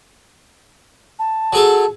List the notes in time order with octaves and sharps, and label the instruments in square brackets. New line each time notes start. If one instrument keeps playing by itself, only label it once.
[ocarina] A5
[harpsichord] F#3 G#4 A4